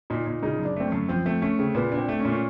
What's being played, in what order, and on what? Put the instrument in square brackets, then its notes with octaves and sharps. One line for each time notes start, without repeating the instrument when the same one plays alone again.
[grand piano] A#2 [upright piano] D#4
[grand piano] A#2
[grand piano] C#3 [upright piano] D#4
[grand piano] F#2
[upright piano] D4
[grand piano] A3 [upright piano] C4
[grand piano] F#2 [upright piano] C#4
[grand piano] F3 [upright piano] C4
[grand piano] A3 [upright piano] C4
[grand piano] A3 [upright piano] C#4
[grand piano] C#3 [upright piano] C4
[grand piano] A#2 [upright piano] B3
[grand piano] D4
[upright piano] C4
[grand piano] A3
[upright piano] C#4
[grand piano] A#2
[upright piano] C#4